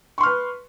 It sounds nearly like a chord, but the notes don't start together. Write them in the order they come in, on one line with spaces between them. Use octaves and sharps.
C#6 C6 F6 B4